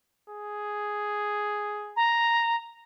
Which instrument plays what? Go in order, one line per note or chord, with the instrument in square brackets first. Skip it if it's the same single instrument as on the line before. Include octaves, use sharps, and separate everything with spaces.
[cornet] G#4
[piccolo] A#5